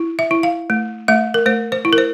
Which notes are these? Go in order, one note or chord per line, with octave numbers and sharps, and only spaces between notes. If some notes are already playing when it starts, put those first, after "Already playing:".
Already playing: E4
E5
E4
F5
A3
A3 E5
A#4
A3 C5
C5
E4
A#4
C5